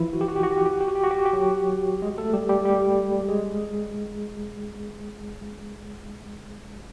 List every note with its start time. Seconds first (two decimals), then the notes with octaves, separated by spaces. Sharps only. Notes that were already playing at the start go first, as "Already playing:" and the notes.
Already playing: E3 F3 E4 F4
0.13 F#4
0.21 G4
0.28 F#4
0.36 G4
0.43 F#4
0.51 G4
0.58 F#4
0.66 G4
0.73 F#4
0.81 G4
0.88 F#4
0.96 G4
1.04 F#4
1.11 G4
1.18 F#4
1.26 G4
1.33 F#3 F#4
2.02 G#3 G#4
2.18 A3 A4
2.33 G3 G4
2.49 G3 G4
2.65 G3 G4
3.28 G#3 G#4